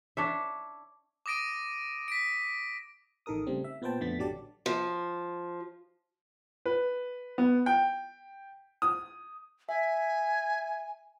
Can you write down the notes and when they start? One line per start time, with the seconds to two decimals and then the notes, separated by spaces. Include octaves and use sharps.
0.17 D4 C#5 E5
1.26 D6 D#6 A#6 D7 D#7
2.08 B6 D7
3.26 A1 D#3 A4 A#4 D#6
3.47 C#3 G3 A3 C4
3.64 E5
3.82 A#2 B3 B4 C5 G5 A5
4.00 F2 D3 A3 B3 A6 B6
4.18 A1 D3 F#3 G4 D5 A5
4.66 F3
6.66 B4
7.38 B3
7.66 G5
8.82 D#6
9.69 E5 G#5